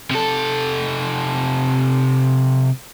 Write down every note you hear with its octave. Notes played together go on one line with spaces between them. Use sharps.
C3 A4